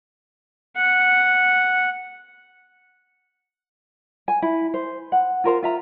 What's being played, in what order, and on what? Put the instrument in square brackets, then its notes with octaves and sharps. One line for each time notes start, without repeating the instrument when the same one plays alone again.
[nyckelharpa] F#5
[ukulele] G#5
E4
C5
F#5
F4 A#4 C5 A#5
F4 E5 A#5